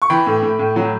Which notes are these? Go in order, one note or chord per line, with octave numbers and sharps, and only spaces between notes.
C#6
E3 G5 B5
A2
A2
A2
F#3